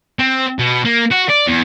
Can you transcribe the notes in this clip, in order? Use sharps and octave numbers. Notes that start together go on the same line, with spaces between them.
C4
B2
A#3
F#4
D5
E2